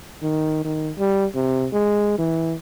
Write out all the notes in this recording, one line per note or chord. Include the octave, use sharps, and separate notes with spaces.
D#3
D#3
G3
C3
G#3
E3